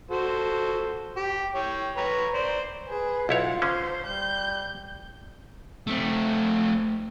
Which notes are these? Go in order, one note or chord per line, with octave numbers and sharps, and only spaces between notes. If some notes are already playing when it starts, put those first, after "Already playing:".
F#4 A4 C5
G4
C#5 G5
B4 C#5 A#5
C5 D5
G#4 B4
B1 E4 F4 C#5 F#5
D3 C#4 C5
G3 G6
A3 C4